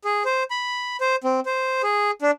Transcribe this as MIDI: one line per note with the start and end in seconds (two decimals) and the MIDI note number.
0.05 0.23 68
0.25 0.43 72
0.51 0.97 83
1.01 1.16 72
1.24 1.40 60
1.46 1.82 72
1.83 2.11 68
2.22 2.31 62